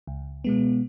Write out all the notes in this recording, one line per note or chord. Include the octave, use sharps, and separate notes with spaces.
C#2
B2 G#3 B3